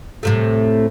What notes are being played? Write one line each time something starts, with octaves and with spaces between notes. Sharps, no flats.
A2 C3 A3